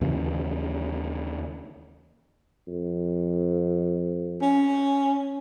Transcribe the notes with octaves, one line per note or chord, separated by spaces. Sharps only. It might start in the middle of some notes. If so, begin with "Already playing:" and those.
D#2 C#3 E3
F2
C#4